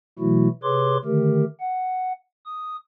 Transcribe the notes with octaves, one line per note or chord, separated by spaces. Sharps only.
B2 E3 F#3 A3 E4 F#4
C3 G#4 B4 C#5 C6 D6
D3 D#3 A3 G4 A#4
F#5
D#6